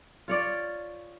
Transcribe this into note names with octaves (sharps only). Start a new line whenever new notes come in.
F4 C#5 D5